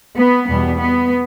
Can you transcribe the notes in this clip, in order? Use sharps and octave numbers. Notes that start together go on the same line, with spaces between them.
B3
E2 B2 G3 B3
B3